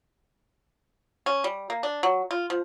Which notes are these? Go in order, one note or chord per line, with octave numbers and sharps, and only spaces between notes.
C#4
G3
A#3
D4
F#3
F4
F3